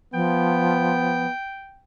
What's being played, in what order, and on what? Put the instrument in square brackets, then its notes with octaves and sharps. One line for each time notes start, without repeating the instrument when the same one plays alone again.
[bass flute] F3 [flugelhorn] B3 [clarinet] G5